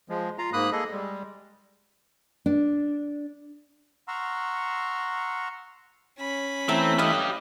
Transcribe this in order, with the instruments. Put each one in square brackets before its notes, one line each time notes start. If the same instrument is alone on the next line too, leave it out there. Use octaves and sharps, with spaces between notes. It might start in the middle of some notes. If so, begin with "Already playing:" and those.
[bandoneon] F3 G#3
F4 F5 A#5
G#2 A#3 B5 D#6 F#6
A#3 G#4 A4 D#5
G3 G#3
[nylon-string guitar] D4
[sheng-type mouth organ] F#5 A#5 C6 C#6 E6 F6
[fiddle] C#4 B5
[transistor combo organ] E3 A3 E4 [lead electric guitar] C4 [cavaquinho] B4 A#5
[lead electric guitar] G4 B4 [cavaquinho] D#5 F5